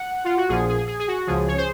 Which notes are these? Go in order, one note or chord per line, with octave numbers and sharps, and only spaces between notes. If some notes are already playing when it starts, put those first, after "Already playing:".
Already playing: F#5
F4
F#4
A#1 A#2 F3 G#4
G#4
G#4
G#4
F#4
C#2 C#3 F3 G#4
C#5
C5